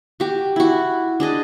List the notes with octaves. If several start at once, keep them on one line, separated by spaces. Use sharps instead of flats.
F#4 G4
E4 F#4
D4 G#4 D#5